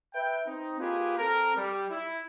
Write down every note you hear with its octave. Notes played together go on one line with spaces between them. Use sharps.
B4 E5 G5
C4 D#4
A#3 F4 G4 G#4 B4
C4 A4 A#4
G3
E4